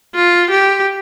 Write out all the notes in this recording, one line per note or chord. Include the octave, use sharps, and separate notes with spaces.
F4
G4